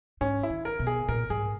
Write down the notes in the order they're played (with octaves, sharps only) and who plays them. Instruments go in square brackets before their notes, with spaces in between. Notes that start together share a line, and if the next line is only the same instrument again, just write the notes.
[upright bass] G#2 [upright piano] C#4
[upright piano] E4
[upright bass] D#3
[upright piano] A#4
[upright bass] B2
[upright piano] G#4
[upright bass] A#2 [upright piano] A#4
[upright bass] G#2 [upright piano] G#4